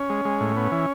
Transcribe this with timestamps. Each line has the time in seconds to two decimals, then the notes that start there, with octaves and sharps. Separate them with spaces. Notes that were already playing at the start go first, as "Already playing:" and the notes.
Already playing: C#4
0.10 G#3
0.25 G#3
0.41 A2
0.57 B3
0.72 E3